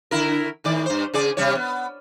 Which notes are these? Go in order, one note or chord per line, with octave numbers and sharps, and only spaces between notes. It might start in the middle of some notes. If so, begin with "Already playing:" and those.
D3 E4 A#4
A2 D#3 D5
G2 C5
C#3 G#4 D5
C3 G3 C#5
B3